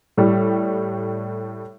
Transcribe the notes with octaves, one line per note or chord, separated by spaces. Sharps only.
A2 G3